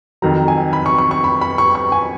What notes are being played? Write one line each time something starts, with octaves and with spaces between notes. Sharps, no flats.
F2 D#3 F#3 A#5
G#5
B5
C#6
C#6
C#6
B5
B5
C#6
C#6
G#5